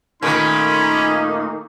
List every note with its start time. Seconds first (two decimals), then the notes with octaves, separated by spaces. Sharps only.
0.23 A#2 D#3 A3 A#3 C#4 D#4 B5